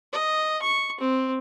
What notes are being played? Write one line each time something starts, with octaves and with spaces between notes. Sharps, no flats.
D#5
C#6
C4